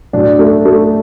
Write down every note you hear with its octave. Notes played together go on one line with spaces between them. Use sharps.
A2 F#3 D4
A3
A3